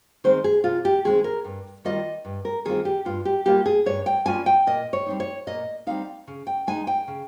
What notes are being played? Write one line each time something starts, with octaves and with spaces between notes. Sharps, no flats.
D#3 G#3 C4 C5
G#4
C3 F4
G4
D#3 G#3 C4 G#4
A#4
G2
D#3 G3 C4 F4 D#5
G2
A#4
D#3 G3 C4 F4 G#4
G4
G2 F4
G4
G3 A#3 C#4 F4 G4
G#4
G2 C#5
G5
G3 A#3 C#4 F4 G#5
G5
A#2 D#5
C#5
G3 C4 D#4
C#5
A#2 D#5
G3 C4 D#4 F5
C#3
G5
G#3 D#4 G#5
G5
C#3